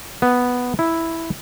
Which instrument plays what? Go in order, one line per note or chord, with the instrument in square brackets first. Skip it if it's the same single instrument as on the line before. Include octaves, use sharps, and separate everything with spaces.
[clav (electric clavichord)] B3
E4